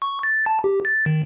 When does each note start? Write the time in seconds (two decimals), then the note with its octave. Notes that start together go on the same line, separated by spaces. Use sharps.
0.02 C#6
0.23 A6
0.46 A5
0.64 G4
0.85 A6
1.06 D#3